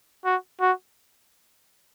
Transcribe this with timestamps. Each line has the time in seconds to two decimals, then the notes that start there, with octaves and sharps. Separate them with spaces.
0.25 F#4
0.61 F#4